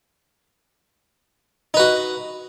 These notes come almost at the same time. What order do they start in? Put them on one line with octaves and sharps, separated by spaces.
D#4 B4 F#4